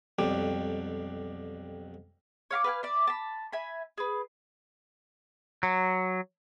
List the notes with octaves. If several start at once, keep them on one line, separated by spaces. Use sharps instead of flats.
B1 F2 G3 G4
C#5 F5 B5 D6
B4 F5 G5 G#5
D5 E5
A5 B5
E5 G#5 B5
G#4 B4
F#3